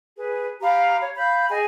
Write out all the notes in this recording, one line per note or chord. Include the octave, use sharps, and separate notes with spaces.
G#4 B4
G4 F5 A#5 B5
C#5
F5 B5 G6
G#4 D#5 G5 G#5